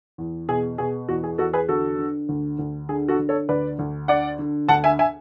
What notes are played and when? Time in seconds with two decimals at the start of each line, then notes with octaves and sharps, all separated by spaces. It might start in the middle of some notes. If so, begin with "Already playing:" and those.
0.18 E2
0.49 B2 G#4
0.78 B2 G#4
1.09 E2 F#4
1.24 G#4
1.38 E2 F#4 A4
1.53 G#4 B4
1.68 D3 F#4 A4
1.99 D3
2.29 D2
2.59 D2
2.89 D3 G#4
3.08 F#4 A4
3.19 D3
3.29 A4 C#5
3.49 D2 B4 D5
3.79 D2
4.08 D3 D5 F#5
4.39 D3
4.69 D2 F#5 A5
4.84 E5 G#5
4.99 E5 G#5